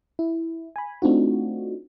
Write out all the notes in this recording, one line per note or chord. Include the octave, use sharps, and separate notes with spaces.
E4
G#5 B5
A3 C4 D4 D#4 F4 F#4